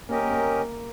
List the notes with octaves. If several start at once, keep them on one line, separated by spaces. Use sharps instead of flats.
A#3 C#4 G4 A#4 D#5
A#3
A#3